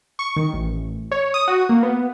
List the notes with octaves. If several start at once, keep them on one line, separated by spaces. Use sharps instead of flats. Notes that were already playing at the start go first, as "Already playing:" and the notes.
C#6
D#3
A1
C#5
D#6
F#4
A#3
B3